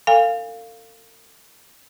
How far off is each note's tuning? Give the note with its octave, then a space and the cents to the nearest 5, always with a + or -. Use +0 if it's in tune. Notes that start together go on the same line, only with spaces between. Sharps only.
A4 +45 F5 +0 G#5 -30